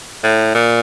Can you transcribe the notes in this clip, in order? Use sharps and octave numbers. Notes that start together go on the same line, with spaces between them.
A2
A#2